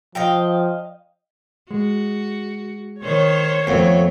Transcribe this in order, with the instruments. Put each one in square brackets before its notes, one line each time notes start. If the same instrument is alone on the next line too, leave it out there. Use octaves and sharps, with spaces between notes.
[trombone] F3 [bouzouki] D#5 F5 G5
[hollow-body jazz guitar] G#3 [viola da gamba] F#4
[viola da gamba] D#3 C5 [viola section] C#5
[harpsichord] F2 [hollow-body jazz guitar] A3 B3 C4